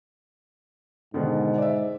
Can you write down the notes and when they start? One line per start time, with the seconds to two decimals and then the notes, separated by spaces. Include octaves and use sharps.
1.14 G#2 B2 D3 D#3
1.58 D5 E5